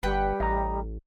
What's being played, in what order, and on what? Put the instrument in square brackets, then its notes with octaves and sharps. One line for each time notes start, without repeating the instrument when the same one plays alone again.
[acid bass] G1 [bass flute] G3 [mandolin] B4 F#5 G5
[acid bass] A1 [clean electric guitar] D#5 A#5